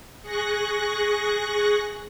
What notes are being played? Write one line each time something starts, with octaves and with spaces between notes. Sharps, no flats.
G#4 C#6 F#6 A#6